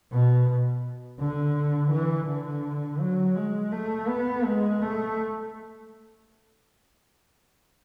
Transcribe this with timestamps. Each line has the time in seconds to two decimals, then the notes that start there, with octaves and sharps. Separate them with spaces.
0.12 B2
1.19 D3
1.92 E3
2.28 D3
3.01 F#3
3.36 G#3
3.72 A3
4.09 B3
4.45 G#3
4.81 A3